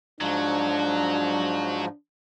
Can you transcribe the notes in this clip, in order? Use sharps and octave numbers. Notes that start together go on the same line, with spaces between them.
G#2 F3 F#3 D4